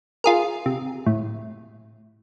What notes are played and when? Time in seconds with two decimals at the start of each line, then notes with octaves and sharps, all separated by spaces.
0.24 F4 G#4 A#4
0.66 C3
1.06 A2